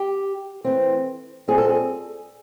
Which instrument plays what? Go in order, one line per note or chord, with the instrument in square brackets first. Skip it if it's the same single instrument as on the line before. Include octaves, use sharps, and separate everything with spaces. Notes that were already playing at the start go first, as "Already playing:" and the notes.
Already playing: [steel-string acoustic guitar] G4
E3 A3 C4
A#2 G3 C4 G#4
A4
G#4